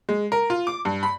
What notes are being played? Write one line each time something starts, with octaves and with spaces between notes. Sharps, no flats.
G#3
A#4
F4
D6
G2
B5